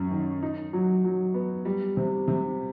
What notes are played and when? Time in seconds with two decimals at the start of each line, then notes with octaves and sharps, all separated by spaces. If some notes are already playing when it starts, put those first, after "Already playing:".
Already playing: F#2 C#4
0.11 D#3
0.43 D#4
0.73 F#3
1.04 F#3
1.34 B3
1.65 G3
1.97 C3
2.28 C3